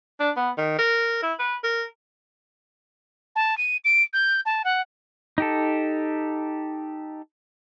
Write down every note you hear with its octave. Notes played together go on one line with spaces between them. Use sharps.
D4
B3
D#3
A#4
E4
B4
A#4
A5
D#7
D7
G6
A5
F#5
D#4 G4 A4